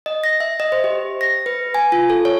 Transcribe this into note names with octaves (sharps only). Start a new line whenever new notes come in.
D#5
A#6
E5
D#5
C5
G4
A#6
B4
G#5
F4
A4
C#5